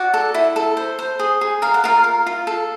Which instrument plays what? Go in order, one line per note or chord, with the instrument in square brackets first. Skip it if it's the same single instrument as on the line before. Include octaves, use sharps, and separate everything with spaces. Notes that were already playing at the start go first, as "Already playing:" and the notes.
Already playing: [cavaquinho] F#4 D5 F#5
A4
E4
A4
C5
C5
G#4
G#4
A#4 F5
F#5
F4 A#4 F5
A#4
F4
A4